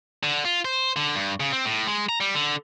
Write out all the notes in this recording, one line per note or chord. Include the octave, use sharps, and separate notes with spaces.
D3
F4
C5
D3
G2
C#3
C4
A2
G#3
A#5
G3
D3